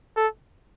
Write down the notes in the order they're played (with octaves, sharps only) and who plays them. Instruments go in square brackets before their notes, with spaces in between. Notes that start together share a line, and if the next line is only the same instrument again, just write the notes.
[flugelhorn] A4